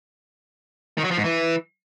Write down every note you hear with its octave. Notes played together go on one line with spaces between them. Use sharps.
D#3
F#3
F3
G#2
E3